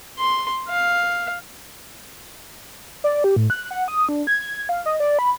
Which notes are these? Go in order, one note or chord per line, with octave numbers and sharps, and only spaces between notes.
C6
F5
D5
G4
A2
F#6
F#5
D#6
D4
G#6
F5
D#5
D5
B5